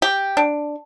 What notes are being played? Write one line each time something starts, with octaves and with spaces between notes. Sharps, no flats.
G4
D4